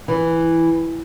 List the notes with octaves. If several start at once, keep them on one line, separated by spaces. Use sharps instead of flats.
E3